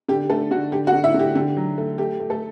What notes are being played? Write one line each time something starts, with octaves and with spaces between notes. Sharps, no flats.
D3 G4
D3 A3 A4
D3 F#4
D3 G4
F#4 F#5
D3
E4 E5
D3
G4
D3 G4
F#3
A3
A3 G4
A3
A3 A4